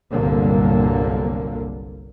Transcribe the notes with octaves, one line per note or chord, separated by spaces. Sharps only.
G1 C2 A#2 D3 F#3 A#3